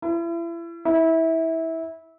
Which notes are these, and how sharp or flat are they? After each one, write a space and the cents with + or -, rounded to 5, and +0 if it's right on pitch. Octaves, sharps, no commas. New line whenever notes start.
E4 +35
E4 -20